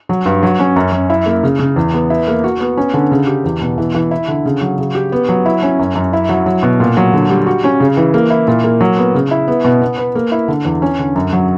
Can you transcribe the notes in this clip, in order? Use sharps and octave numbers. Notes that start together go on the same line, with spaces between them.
F#3
G2
F#3
C#4
F#2
F#2
E4
A#3
C#3
C#3
E2
B3
E4
A#3
F#4
B3
C#4
D3
C#3
G4
E2
B2
E3
E3
E4
D3
C#3
F#3
C#3
G4
B3
F#3
E4
C#4
F#2
F#2
E4
F#3
F#3
B2
A#2
F#3
D3
G3
F#4
C#4
C#3
E3
A#3
E4
A#2
A#3
F#3
B3
C#3
E4
B3
B2
B3
B4
A#3
E4
D3
E2
C#4
D3
F#2
F#3